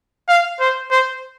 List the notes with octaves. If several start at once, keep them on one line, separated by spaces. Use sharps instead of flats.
F5
C5
C5